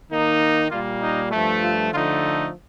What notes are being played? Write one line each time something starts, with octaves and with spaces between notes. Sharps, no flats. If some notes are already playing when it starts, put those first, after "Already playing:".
D#3 A#3 D#4
A#2 G3 A#3 F4
D#4
G2 F3 A3
F4
D3 F3 A3 D#4 F4